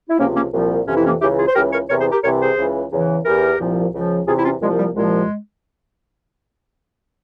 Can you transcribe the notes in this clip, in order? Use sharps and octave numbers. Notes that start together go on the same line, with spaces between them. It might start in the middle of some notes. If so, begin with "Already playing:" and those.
E4
C#2 C3 F3 A#3 C#4
A#3 C#4
C2 A#2 F3
F2 C3 E3 C#4
E4
A#3 C#4
C#2 C#3 E3 E4 G4
F4 G#4
C5
C#2 C#3 E3 G4 A#4
A#4 C#5
E2 C3 E3 A#4 C#5
G#4 C5
G4 A#4
C2 C3 E3 A#4 C#5
G#4 C5
C#2 C#3 E3
E2 C#3 E3
E2 E3 G4 A#4
C2 A#2 F3
C#2 C#3 F3
E2 C3 E3 F4 G#4
E4
C#4 F4
C2 A#2 F3 G#3
G3
C2 A#2 F3 G#3